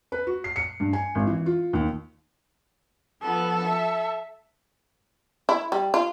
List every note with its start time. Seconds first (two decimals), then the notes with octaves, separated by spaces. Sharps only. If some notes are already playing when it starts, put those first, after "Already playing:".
0.12 B4
0.27 F#4
0.44 C7
0.56 C#7
0.80 G2
0.93 G#5
1.15 G#1
1.27 E3
1.46 F4
1.73 D#2
3.22 F3 B3 A4
3.65 E5
5.49 E4
5.72 G3
5.94 F4